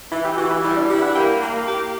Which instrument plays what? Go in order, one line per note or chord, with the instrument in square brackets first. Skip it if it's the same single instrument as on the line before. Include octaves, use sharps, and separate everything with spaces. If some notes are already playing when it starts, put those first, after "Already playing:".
[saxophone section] E3 [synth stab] E4
[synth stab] G4
[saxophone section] E3 [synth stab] F#4
[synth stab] E4
[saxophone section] G3 [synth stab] E4
[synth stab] D4
[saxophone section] E4 [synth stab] G4
[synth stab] F#5
[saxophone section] A#3 [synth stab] G5
[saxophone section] A#3
G4